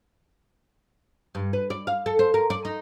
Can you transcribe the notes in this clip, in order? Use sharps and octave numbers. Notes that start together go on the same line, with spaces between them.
G2
B4
D5
F5
A4
C5
A#4
D5
D#4